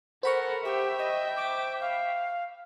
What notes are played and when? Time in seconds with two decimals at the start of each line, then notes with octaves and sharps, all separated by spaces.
0.23 A4 A#4 C5 F#5 B5 C#6
0.64 G4 E5 G5
0.98 D#5
1.36 D6
1.80 F5